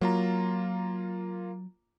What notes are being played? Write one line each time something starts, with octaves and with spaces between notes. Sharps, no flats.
F#3 A#3 F4 A#5